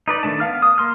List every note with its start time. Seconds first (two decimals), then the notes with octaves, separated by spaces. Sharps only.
0.08 D#4 B4 D5
0.23 D#3 A3 D4 A5
0.40 B3 F5 F6
0.62 D#6
0.78 A#3 C6 F6